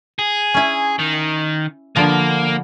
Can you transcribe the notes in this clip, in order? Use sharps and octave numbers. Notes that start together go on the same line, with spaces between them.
G#4
C#4 E4
D#3
D3 F3 A#3 B3